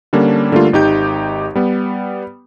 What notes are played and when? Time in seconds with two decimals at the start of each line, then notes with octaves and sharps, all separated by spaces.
0.13 D3 G3 A#3 C#4 D4
0.52 D3 G3 A3 A#3 F4
0.73 G#1 D#4 G4 G6
1.55 G3 B3